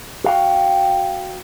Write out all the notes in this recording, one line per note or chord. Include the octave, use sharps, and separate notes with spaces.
F#4 F5 G5